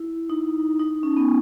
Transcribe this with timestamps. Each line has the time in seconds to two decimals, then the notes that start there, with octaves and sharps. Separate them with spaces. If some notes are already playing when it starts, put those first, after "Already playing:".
Already playing: E4
0.30 D#4
0.79 D#4
1.03 C#4
1.17 B3